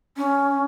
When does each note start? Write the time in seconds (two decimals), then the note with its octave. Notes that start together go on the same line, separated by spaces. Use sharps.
0.17 C#4